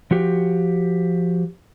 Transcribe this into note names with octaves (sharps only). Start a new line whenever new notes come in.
F3 F#4 G4